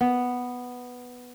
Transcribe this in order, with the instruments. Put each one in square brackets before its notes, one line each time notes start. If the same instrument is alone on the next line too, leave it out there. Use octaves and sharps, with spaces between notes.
[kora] B3